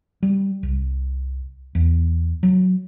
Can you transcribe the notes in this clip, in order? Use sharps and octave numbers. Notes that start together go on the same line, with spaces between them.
G3
C2
E2
F#3